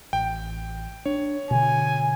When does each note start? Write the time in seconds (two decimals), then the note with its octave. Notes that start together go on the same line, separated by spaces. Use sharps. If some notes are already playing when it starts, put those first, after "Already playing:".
0.13 A1 G5
1.06 D4 C#5
1.51 B2 D3 G#5